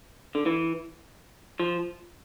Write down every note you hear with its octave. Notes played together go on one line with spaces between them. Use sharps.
D3
E3
F3